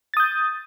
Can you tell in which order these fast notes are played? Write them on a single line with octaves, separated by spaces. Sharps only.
A6 D#6 G6